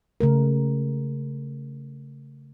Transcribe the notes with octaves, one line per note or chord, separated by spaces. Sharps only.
C#3 A3 A#4